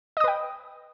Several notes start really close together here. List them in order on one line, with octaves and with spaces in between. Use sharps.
D#5 D#6 B4 G5